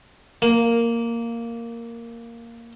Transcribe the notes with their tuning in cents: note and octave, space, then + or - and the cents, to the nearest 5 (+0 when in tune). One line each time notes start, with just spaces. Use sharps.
A#3 -5